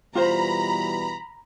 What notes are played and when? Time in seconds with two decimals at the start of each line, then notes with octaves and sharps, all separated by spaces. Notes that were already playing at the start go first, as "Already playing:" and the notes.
0.15 B2 E3 G3 F4 C5 A#5 B5